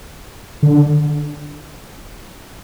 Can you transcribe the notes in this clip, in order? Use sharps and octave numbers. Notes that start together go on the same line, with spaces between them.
D3